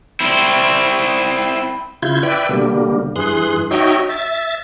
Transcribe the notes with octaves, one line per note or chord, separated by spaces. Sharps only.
C4 E4
C#3 E4 F4 G6 G#6
B4 D5 E5 G5
B2 D3 G3 A#3
G2 E3 G#4 C6 F#6
D#4 F#4 C#5 D#5 E5 G5
E5 A6